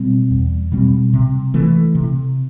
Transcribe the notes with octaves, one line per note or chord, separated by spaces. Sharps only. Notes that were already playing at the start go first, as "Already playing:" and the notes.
Already playing: B2 G3 C4
E2
B2 G3 C4
C3
E3 A3
C3